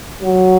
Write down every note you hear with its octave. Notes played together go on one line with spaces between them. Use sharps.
F#3